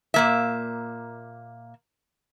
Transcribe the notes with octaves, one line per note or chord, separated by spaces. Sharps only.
A#2 A#3 E5